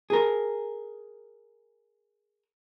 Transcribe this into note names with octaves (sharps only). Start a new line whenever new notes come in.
G#4 A#4